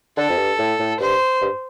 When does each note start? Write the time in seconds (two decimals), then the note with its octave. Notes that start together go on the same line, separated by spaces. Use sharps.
0.17 D3 A4
0.30 F2
0.38 G2
0.59 A2
0.79 A2
1.00 G2 C5
1.41 G2